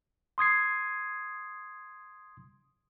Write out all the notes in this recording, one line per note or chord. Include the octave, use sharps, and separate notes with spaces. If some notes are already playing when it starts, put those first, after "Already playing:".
C6 D#6 G#6 C7